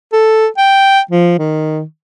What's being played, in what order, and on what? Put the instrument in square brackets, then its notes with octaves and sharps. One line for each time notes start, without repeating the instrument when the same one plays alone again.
[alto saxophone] A4
G5
F3
D#3